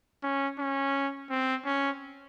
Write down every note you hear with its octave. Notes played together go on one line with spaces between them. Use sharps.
C#4
C#4
C4
C#4